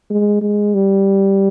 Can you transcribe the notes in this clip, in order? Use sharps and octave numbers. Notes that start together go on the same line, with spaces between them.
G#3
G#3
G3